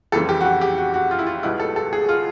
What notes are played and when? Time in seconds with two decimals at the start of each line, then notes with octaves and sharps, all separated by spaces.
0.12 F2 C#3 E3 G3 C4 A4
0.29 G4
0.41 F#4
0.45 G4
0.61 G4
0.78 F#4
0.94 F#4
1.11 F4
1.19 E4
1.27 F4
1.43 C#2 B2 G3 B3 D#4 E4
1.60 A4
1.76 A4
1.93 G#4
2.09 F4